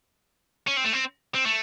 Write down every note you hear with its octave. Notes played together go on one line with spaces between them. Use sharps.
C#4
C4
A3
C4
C4
A3